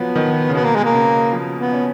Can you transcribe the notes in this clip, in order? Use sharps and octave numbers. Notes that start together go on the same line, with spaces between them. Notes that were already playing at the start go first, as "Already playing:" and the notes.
Already playing: F3 F#3 B3
D#3
C#3
B2 B3
A#3
G#3
A#3
C#3
F3
B3
C#4